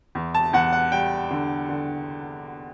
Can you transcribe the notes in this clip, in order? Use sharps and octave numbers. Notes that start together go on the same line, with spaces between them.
E2
A5
E2 F#5
F#5
G3 G5
D3
D3